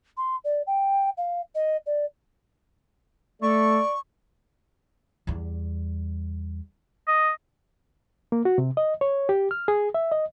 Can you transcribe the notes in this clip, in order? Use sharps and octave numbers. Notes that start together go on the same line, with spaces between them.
C6
D5
G5
F5
D#5
D5
A3 A4 D5 C#6
E2 G3
D#5
A#3
F#4
C3
D#5
C#5
G4
F6
G#4
E5
D#5